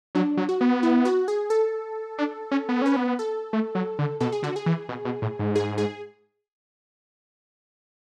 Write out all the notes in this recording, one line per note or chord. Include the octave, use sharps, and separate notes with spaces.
F#3 D4
F#3
F#4
B3
E4
F#4
G#4
A4
D4
C#4
B3
C#4 B4
B3
A4
A3
F#3
D3
B2 A4
G#4
D3 F#4
G#4
E3
B2
B2
A2
G#2
G#4
G#4